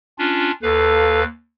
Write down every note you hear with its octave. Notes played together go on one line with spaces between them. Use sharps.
C#4 D4 F4
D#2 A4 B4 F5